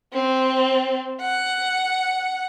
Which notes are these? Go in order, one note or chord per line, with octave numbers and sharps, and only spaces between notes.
C4
F#5